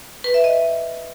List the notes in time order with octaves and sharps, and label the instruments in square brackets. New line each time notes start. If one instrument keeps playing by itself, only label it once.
[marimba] B4
E5
D#5